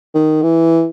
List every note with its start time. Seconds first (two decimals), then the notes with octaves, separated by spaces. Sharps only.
0.15 D#3
0.43 E3